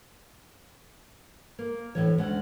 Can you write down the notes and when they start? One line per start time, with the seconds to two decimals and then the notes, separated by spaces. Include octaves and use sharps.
1.59 A#3
1.95 D2 A2 E3 C#5
2.18 D2 G#3 C#4 F#5